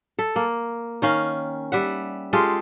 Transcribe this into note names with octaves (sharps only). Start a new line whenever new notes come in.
A4
A#3
D#3 C#4 F5
G3 E5 F#5
G#3 F4 G4 A4